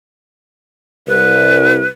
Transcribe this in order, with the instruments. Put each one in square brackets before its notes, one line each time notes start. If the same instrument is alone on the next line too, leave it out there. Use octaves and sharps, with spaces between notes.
[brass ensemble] C2 [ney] B4